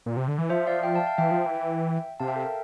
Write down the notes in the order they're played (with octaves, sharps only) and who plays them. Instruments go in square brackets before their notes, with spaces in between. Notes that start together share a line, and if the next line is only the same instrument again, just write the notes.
[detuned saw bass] A#2
C3
D3
E3
[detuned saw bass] F3 [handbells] C5 E5
[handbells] D5 F5
E5 G5
F5 A5
F5 A5
[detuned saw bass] E3 [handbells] E5 G5
[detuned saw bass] F3
E3
[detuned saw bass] C3 [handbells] F5 A5
[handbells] E5 G5
A4
A#4